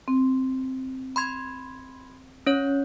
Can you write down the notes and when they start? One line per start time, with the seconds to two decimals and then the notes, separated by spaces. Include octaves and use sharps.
0.08 C4
1.16 B5 C6 G#6
2.47 C#4 C#5 G6